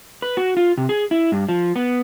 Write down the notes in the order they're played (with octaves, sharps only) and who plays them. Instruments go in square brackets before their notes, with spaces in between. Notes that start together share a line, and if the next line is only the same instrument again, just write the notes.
[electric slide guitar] B4
F#4
F4
C3
G#4
E4
G2
F3
B3